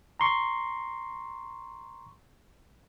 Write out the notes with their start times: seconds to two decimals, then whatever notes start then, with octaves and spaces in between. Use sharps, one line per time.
0.20 A#5 C6 C#6